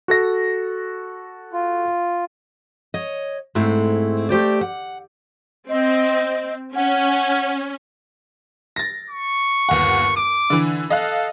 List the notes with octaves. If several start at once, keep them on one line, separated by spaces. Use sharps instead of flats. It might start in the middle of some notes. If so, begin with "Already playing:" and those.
F#4 A4 A#6
F4
C#5 D#5
G#2 G#3 A3 C4 E4
A3 G4 C5 D5
F#5
C4 D#5
C#4 F#5
A6 A#6
C#6
G1 D#2 F#5
D6 D7
D3 E3
A4 D#5 F5 F#6